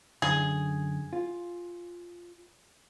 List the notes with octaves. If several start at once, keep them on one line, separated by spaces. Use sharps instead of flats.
F#2 D3 G#4
F4